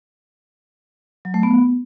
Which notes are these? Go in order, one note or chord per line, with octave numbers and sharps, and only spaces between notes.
F#3
A3
B3